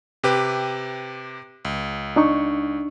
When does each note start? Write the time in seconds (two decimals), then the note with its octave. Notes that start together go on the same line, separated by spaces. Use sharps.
0.24 C3 G4 B4
1.65 C#2
2.16 D4 D#4 C#6